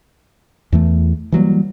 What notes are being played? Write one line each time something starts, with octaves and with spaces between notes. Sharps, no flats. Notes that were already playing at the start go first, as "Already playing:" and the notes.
E2 E3 A3
E3 F#3 G3 A#3